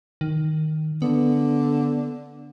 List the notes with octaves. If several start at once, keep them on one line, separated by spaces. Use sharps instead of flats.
D#3
D3 B3